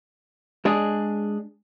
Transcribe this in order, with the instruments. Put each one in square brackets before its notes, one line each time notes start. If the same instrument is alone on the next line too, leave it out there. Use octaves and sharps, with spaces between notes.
[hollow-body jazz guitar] G#3 D4 G#4